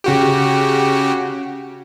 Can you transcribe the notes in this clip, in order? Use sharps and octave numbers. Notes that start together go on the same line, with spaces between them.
C#3 F#4 G4